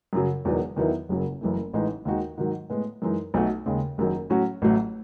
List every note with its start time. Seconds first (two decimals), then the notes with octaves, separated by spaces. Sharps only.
0.13 F#2 C#3 F#3
0.45 E1 E2 D#3 F#3 B3
0.76 E2 D#3 F#3 B3 E4
1.09 F#1 F#2 C#3 F#3
1.41 F#1 F#2 E3 A3
1.74 A1 A2 E3 G#3 D#4
2.05 D#2 D#3 G#3 D#4 F#4
2.37 G#2 D#3 F#3
2.70 A2 G#3 B3
3.02 F#2 E3 G#3 D#4
3.34 B1 B2 A3 D#4 F#4
3.66 D#2 C#3 G#3
3.98 F#1 F#2 D#3 F#3
4.30 A2 F#3 C#4 F#4
4.62 A1 A2 F#3 A3